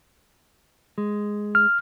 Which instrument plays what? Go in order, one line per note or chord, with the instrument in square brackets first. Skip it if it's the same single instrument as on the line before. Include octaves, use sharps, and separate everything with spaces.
[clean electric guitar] G#3
[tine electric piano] F6